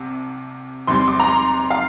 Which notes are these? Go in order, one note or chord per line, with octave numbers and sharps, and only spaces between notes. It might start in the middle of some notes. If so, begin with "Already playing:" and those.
Already playing: C2 C3
E2 C3 G3 C6
D6
A#5
C6
F5